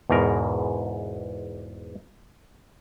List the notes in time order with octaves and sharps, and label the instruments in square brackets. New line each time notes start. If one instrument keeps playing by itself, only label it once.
[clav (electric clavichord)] E2 G#2 B2 A#4